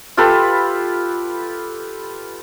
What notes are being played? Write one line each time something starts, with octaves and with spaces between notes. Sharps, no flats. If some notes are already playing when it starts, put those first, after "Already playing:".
F4 G4 A4 B4